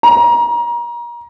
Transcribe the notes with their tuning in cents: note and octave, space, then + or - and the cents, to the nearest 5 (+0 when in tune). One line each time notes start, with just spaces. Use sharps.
A#5 +30